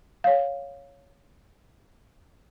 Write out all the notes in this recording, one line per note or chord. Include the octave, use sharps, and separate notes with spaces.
C#5 F5